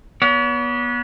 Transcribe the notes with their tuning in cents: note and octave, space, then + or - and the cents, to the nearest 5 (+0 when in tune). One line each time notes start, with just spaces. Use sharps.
B3 -25 C#5 +40